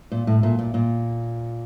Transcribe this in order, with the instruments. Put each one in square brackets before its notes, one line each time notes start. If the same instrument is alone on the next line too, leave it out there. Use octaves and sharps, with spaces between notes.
[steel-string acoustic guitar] A#2
A2
A#2
A#2
A#2